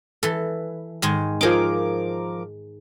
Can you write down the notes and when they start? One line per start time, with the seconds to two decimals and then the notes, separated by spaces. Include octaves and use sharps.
0.23 E3 A4
1.02 G#2 D#3 G#3
1.41 F3 D#4 G#4 A#4 D6